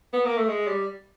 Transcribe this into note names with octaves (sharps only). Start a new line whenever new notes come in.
B3
A#3
A3
G#3
G3